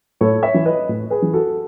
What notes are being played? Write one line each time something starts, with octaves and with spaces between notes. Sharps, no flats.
A2 A4 C#5
C#5 E5
E3
B4 D#5
A2
G#4 B4
E3
F#4 A4